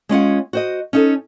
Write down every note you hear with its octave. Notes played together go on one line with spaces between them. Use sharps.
G#3 C#4 F4 F#5
F#4 C5 D#5
C#4 D#4 A4